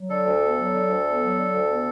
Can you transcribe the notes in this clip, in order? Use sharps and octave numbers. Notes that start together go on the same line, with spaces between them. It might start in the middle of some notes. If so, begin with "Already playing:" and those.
Already playing: F#3
D3 A4
D2
B3
F#3
D3
D2
B3
F#3
D3
D2
B3